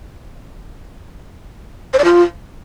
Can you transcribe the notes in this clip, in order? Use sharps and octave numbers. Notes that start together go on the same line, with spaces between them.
C5
D5
F4